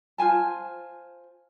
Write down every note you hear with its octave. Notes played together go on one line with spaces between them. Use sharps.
F4 C5 G#5 A5